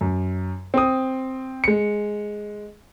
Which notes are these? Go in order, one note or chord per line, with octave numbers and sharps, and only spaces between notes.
F#2
C4 D#6
G#3 C#7